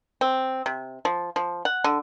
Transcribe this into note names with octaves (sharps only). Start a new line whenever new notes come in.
C4
C3
F3
F3
F#5
D3